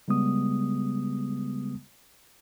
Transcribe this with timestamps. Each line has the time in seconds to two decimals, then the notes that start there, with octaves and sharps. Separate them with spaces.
0.08 C#3 G3 G#3 B3 D#6